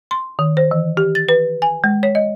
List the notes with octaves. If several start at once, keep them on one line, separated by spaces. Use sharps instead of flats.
C6
D#3
C5
E3
G4
A6
B4
G#5
G#3
C#5
D#5